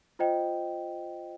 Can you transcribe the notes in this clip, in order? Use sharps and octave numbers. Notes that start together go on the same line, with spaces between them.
F4 C5 D#5 G5